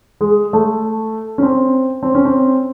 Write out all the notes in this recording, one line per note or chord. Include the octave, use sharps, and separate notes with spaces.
G#3
A3
C#4
C4
C4
C#4
C4